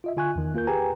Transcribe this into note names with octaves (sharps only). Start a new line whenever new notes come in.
F4 D#5 E5
D3 F4 G#5 C#6 F#6
E2 D#3
A#3 F4 A#4 G6
G4 G#4 B4 G5 G#5 A#5